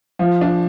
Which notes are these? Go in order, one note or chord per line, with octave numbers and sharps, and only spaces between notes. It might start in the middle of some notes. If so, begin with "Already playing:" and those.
F3
D4